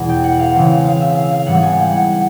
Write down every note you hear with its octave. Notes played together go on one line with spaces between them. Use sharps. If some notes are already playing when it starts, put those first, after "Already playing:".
Already playing: E2 B2 E3 G#3
G5
F#5
F5
C#3 E3 G#3 C4 F5
F5
E5
F5
F5
G#2 E3 G3 B3 F#5
G#5
G5
F#5